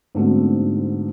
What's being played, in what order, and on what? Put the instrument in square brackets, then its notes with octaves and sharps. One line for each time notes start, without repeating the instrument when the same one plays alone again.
[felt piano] G#2 D3 A3 B3 C4 F#4